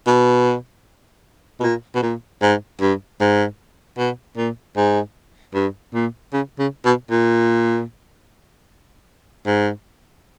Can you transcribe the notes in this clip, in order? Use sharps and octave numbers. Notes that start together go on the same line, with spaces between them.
B2
B2
A#2
B2
A#2
G#2
G2
G#2
B2
A#2
G#2
G2
A#2
C#3
C#3
B2
A#2
G#2